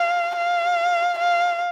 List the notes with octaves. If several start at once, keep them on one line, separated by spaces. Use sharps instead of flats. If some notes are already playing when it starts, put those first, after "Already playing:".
Already playing: F5
F5
F5